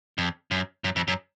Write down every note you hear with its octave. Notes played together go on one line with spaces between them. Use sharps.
F2
F#2
F#2
F2
F#2